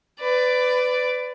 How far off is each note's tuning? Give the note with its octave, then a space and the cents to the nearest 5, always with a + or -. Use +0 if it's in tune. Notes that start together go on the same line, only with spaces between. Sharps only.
B4 +25 D5 +0